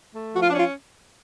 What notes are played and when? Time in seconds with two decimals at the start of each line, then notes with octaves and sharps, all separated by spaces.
0.14 A3
0.35 F3 F#4
0.42 F4
0.51 D4
0.55 C#4 F4